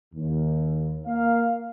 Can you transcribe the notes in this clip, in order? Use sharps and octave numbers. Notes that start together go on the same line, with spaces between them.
D#2
A#3 F5